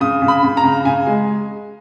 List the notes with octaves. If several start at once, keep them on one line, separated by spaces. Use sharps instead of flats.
C#3 D#6
C#3
B5
C#3
A#5
C#3
C#3 G#5
G#3